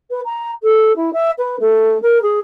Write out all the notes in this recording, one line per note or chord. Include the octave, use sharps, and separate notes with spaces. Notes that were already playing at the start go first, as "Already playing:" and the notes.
B4
A#5
A4
E4
E5
B4
A3
A#4
G#4